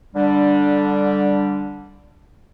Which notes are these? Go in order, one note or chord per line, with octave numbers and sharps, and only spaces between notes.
D3 G3 D4